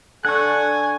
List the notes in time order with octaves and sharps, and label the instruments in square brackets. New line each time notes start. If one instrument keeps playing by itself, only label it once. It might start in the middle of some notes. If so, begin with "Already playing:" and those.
[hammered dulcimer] D3 [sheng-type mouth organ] A4 F#5 [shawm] G#5 [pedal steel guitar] C#6 F#6